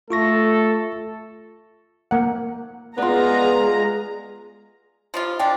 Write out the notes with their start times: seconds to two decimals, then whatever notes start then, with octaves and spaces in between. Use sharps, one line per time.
0.10 A3 F4 A4 C#6 A#6
2.11 A#3 F#5
2.98 G#3 B3 F4 G#4 D5 A#5
5.14 F3 G3 F4
5.39 F3 G#3 D4 G5